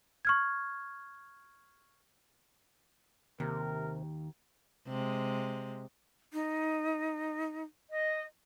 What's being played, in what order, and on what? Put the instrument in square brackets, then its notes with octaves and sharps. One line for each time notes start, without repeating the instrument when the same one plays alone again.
[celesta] C#6 F6 G#6
[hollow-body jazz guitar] D#2 [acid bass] C3 [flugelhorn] A#4
[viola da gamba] C3 G#3
[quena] D#4
[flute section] D#5